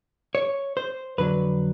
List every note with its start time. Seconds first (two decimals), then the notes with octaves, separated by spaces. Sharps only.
0.35 C#5
0.77 C5
1.18 F2 D3 F#3 B4